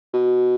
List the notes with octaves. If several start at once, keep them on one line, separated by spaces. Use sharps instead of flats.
B2